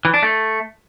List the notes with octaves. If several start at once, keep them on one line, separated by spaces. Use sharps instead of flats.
E3
D4
A3